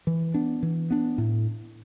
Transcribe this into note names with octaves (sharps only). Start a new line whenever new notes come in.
E3
B3 D4
E3
B3 D4
A2